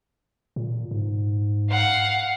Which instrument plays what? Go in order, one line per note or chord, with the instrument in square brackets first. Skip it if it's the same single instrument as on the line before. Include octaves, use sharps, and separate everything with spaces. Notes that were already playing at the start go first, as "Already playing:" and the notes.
[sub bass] A#2
G#2
[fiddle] F5 F#5